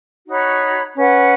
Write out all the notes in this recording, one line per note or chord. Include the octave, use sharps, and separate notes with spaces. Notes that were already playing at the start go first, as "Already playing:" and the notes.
D#4 F#4 C#5 B5
C#4 B4 F#5